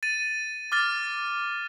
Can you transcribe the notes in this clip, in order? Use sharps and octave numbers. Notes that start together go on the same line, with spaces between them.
A6 D#7
D6 F6 A6